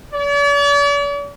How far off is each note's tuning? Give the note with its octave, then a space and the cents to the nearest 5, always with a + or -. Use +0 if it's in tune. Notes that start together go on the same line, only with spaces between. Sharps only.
D5 -45